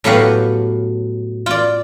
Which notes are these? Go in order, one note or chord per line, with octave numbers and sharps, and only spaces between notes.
A2 F#3 B3 G4 F5 F#5
F4 D5